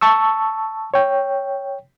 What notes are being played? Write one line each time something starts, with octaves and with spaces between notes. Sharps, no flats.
A5 C#6 E6
C#5 G5